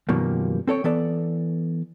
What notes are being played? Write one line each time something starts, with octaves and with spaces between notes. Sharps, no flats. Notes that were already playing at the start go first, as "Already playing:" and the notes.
F#2 B2 D#3 F3 G3 A#3
C4 A4 C#5 G5
E3 B3 A4 D5